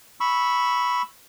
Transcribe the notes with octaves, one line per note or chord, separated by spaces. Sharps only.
B5 C#6 E6